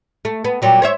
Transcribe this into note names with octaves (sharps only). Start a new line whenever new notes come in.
A3
B3
A#2 F#3 G3
C5 C#5 E5